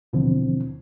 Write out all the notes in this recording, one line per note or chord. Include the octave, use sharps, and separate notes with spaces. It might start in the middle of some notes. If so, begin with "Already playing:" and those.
D#2 B2 D3 E3 F3 C4